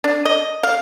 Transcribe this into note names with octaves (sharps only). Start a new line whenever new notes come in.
D4
D#5
F5